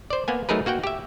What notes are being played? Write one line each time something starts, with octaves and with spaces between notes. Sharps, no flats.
C5 D5
A#3 B3 G#5
F#3 A3 D#4 G#4 A#4 B4
A#3 F#4 F#5 G5
G4 E5